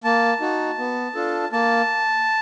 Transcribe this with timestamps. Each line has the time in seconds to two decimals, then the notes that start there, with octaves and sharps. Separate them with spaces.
0.04 A#3 A5
0.41 D#4 F#4
0.78 B3
1.15 D4 F4 A4
1.52 A#3 A5